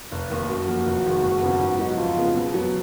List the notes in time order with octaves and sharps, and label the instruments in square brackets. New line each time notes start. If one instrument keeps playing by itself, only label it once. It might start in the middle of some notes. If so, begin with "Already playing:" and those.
[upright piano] F1
D#2 D#3
[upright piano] F#2 [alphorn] F#4
[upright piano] F3 A#3
F1
D#2 D#3 G#3
F#1
F2 C#3 F3 B3
G#2
F#3 B3 D#4
[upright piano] F2 [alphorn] F4
[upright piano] C#3 G#3 B3
B2
F#3 B3